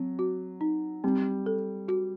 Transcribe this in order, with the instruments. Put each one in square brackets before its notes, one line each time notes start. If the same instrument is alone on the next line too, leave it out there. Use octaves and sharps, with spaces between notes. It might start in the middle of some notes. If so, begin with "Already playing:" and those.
Already playing: [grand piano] F#3 [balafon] C4
[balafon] F#4
D#4
[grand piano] G3 [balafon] C4
[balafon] A4
F#4